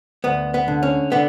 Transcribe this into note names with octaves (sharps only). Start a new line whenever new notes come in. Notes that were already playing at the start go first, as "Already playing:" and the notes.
D2 B3
B3
D3
C#4
D3 B3